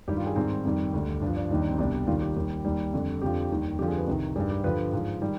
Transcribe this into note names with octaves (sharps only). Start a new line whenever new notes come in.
G2 D#3 G3 G4
F4
G#4
G#2 D#3 G3 C4
F2 D#3 G3
D2 D3 G3
G2 F3 D4
D4
D#2 D#3 G3 D#4
D4
C4
C2 B2 G3 D4
D#2 D#3 G3 F4
G4
D#2 D#3 G3 G4
D#2 D#3 G3
F2 D3 G3
F2 D3 F3 G4
D#2 D#3 G3
F2 D3 F3 G4
G#4
B4
C2 C3 D#3
G2 D#3 G3 G#4
G4
G2 D3 F3 B4
G#2 F3
D#3 G3